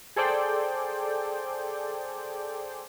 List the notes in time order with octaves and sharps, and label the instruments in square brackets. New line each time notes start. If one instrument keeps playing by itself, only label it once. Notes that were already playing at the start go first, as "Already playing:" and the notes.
[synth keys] G#4 A4 C5 D5 G5